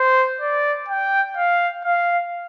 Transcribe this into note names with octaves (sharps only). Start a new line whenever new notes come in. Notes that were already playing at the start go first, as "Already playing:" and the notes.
Already playing: C5
D5
G5
F5
F5